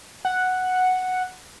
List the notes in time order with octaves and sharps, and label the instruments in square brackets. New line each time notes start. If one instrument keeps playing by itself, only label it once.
[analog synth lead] F#5